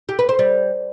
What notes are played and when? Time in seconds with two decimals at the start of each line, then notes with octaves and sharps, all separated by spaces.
0.09 G4
0.19 B4
0.29 C5
0.39 G3